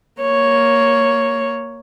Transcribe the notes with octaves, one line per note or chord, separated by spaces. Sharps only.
A#3 C#5